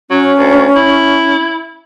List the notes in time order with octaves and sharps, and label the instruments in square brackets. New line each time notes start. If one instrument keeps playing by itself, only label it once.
[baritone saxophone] F#3 [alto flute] C#4
[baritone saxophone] D2
E4